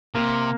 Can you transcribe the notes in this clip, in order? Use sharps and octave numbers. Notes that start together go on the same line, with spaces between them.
C3 A#3